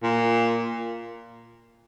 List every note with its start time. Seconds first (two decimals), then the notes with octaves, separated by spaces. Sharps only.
0.03 A#2